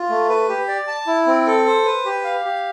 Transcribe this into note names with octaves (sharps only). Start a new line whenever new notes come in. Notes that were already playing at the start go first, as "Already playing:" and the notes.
Already playing: F4
A3
B4
G4
D5
A5
E4
C4
A4
C5
B4
G4
F5
G4